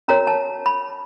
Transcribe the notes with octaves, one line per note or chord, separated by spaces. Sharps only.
C#4 F#4 A#4 C#5 A#5
A5
B5